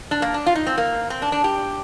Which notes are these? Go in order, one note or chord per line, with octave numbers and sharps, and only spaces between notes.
D4
A#3
D4
F4
D#4
C4
A#3
C4
D4
D4
G4